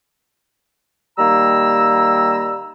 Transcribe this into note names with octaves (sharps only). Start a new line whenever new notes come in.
D#3 G3 A#3 A#5 E6